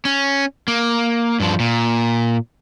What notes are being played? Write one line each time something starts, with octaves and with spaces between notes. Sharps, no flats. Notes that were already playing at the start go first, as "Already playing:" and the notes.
C#4
A#3
G2 F3
A#2